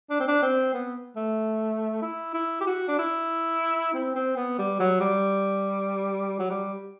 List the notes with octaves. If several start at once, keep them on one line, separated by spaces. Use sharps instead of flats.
D4
C4
D4
C4
B3
A3
E4
E4
G4
F#4
D4
E4
C4
C4
B3
G3
F#3
G3
F#3
G3